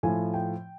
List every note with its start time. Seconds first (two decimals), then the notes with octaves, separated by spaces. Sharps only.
0.03 A2 F3 G#5
0.34 G5